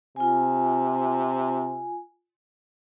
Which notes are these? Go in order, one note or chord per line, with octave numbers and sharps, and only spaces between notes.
C3 F4 G#5